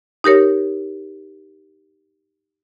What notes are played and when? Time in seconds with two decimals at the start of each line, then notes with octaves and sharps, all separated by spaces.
0.24 D#4 G4 A#4 C#5